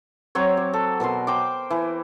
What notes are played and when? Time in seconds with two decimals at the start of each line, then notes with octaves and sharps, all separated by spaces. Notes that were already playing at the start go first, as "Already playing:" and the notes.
0.35 F#3 C4 C#5
0.57 D6
0.73 A4
1.00 B2 A#4 B4 C6
1.27 C5 G5 D6
1.70 E3